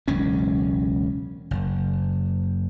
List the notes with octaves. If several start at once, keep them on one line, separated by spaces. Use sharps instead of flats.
E1 C#2 F#3 C#4
F#1